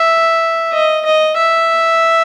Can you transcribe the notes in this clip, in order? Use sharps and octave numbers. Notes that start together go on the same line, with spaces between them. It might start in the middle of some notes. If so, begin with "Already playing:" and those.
Already playing: E5
D#5
D#5
E5